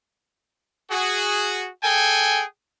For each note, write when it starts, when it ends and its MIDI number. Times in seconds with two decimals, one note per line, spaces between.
0.91 1.69 66
0.91 1.69 68
1.84 2.44 68
1.84 2.44 69
1.84 2.44 79
1.84 2.44 80